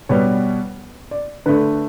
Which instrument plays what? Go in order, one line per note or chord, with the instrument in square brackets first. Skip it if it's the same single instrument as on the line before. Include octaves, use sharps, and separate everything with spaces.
[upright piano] B2 G3 B3 C#5
D5
D3 A3 B4